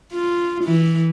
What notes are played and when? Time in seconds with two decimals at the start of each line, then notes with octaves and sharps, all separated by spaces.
0.13 F4
0.64 E3